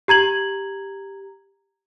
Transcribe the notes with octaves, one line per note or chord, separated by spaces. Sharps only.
G4 A#5 G#6 F#7